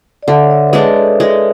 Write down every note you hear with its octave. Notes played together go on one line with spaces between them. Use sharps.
D5
D3 E5
C#5
D5
B4
G#3 D4 C#5
A4
G#3